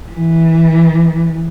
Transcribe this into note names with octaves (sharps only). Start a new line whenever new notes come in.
E3